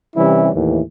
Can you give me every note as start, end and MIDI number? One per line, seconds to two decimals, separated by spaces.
0.16 0.49 48
0.16 0.49 52
0.16 0.49 55
0.16 0.49 61
0.16 0.49 64
0.53 0.81 39
0.53 0.81 45
0.53 0.81 52